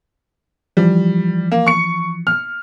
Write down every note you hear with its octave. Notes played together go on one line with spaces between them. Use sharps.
E3 F3 G3
A#3
C#6 C#7
F6